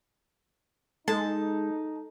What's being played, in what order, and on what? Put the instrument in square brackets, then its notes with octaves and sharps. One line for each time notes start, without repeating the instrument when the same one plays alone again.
[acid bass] G#3 [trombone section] D#4 [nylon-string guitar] A4 [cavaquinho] A5